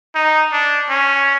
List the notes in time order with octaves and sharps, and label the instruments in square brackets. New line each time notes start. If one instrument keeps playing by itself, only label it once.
[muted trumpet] D#4
D4
C#4